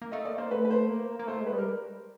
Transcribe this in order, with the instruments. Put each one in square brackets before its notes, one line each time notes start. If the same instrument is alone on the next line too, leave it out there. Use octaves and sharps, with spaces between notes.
[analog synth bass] A#3
[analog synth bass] A3 [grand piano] D#5
[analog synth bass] A#3 [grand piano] D5
[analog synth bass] A#3 [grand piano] C5
[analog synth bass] A3 [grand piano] B4
[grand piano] B4
C5
[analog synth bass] A#3
A#3
[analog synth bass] A3 [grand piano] C5
[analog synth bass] G#3
[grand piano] B4
[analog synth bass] G3
[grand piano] A#4